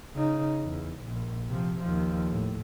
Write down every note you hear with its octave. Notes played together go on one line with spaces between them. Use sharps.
C#3 D#4
E2
A#1
C3 F3
D#2 F3
A2